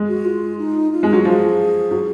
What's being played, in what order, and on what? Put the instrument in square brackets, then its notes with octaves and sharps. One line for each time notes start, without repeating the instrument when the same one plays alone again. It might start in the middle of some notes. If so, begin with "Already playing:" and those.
Already playing: [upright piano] G#3
[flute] F#4
F4
D#4
F4
[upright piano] G#3
F#3
[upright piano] F3 [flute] G#4
[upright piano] F#3